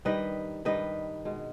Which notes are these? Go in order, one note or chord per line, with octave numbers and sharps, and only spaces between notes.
G2 D#3 G3 B4 D#5
G2 D#3 G3 B4 D#5
B2 G#3